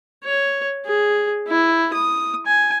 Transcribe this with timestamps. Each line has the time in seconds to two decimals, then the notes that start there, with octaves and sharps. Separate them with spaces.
0.24 C#5
0.86 G#4
1.48 E4
1.93 D#6
2.47 G#5